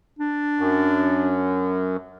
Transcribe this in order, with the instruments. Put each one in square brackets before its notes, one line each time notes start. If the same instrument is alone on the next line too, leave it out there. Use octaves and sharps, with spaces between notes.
[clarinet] D4
[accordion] F#2